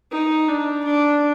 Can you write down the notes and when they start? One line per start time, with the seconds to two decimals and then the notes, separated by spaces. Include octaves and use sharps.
0.11 D#4
0.48 D4
0.84 D4